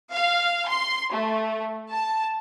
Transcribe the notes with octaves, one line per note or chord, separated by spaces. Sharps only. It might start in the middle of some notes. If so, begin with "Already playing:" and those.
F5
C6
A3
A5